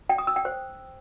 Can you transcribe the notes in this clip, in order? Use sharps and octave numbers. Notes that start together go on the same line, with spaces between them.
G5
D#6
E6
G5
C5